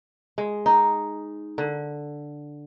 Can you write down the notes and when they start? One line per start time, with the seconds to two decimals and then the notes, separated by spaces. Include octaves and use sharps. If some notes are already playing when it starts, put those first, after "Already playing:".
0.38 G#3
0.66 D#4
1.58 D3